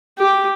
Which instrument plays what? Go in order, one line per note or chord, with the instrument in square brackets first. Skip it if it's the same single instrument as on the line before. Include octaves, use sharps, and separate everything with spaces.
[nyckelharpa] G4